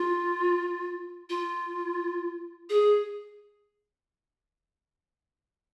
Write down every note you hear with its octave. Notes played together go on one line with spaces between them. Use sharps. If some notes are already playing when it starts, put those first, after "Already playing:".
Already playing: F4
F4
G#4